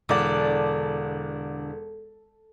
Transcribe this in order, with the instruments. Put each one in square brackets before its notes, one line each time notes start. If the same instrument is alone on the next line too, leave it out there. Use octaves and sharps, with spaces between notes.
[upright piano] E1 D5 [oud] D3